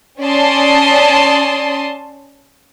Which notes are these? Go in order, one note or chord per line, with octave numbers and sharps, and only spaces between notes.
C#4 D5 A5 C6 D#6